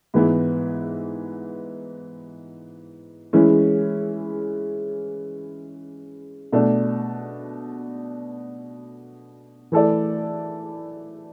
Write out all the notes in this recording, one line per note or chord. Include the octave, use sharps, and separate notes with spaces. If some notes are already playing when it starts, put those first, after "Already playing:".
G#2 E3 B3 E4
E3 G#3 C#4 E4
B2 A3 D4
E3 A3 E4 A4 D5